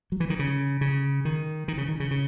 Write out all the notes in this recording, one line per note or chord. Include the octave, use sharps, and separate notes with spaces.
F#3
E3
D#3
C#3
C#3
D#3
D#3
C#3
D#3
C#3
C#3